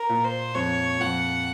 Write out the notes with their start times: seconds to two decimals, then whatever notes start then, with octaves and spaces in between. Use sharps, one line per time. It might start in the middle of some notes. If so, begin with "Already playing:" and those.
Already playing: A#4
0.09 A#2
0.24 C5
0.55 F2 C#5
1.00 F2 F#5